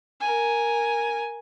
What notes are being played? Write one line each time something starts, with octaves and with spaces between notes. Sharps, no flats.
A#4 G#5